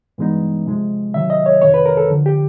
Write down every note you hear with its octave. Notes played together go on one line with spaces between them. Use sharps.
G2 E3 G#3 B3 D#4
C3 F3 G#3
C3 D#3 F#3 E5
D#5
C#5
F2 C3 D#3 C#5
B4
A#4
A4
D2 D3 F3
G4